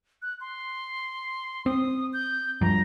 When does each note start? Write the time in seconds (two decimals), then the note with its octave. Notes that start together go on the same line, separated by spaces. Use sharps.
0.22 F#6
0.41 C6
1.66 C4 D#6
2.13 G6
2.61 G2 F3 A#5